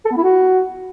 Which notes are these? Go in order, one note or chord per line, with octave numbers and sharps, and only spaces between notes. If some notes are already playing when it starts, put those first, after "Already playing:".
A4
B3
E4
F#4